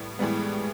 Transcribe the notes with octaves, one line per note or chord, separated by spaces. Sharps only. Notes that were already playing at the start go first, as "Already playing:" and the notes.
Already playing: A2 G3 B3
A2 E3 G3 G#3 B3